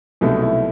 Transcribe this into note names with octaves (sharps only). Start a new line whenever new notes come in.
C2 B2 F#3 A3 D#4
E4